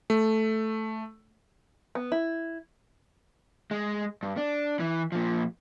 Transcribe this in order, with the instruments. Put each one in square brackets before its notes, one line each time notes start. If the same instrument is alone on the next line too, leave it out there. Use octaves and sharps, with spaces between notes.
[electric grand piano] A3
[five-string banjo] B3
E4
[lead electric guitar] G#3
G2
D4
E3
A#2 F3